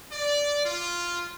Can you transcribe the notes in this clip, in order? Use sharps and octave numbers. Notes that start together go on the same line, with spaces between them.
D5
F4